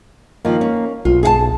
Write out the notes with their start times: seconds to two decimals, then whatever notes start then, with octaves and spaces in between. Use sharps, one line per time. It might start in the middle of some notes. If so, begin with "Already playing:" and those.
0.45 D#3 F3 A#3
0.61 C#4
1.05 B1 F4
1.23 G#4 F5 A5